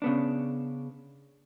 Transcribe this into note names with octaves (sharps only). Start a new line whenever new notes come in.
C#3 B3 D4